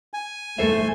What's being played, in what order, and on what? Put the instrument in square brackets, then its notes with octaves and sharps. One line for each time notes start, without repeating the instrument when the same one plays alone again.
[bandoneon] G#5
[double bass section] E2 A3 [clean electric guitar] A4 C5 E5